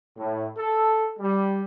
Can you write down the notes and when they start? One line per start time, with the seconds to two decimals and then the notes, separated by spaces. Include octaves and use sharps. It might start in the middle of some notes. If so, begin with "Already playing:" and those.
0.17 A2
0.56 A4
1.19 G3